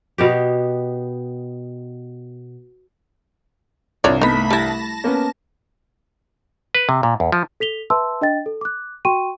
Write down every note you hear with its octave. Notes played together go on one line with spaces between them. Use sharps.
B2 B3 G4
C2 G2 F4 C#5 D5
A3 B3 D#4 B5 B6
G3 E4 A5 A#6
A#3 B3 C#4
B4
C3
A#2
E2
F3
A4 B6 F7 G7
B4 E5 A5 C6 E6
D4 D#5 G5 A6
A4
D6 F#6
F#4 G5 C6 C#6 D#7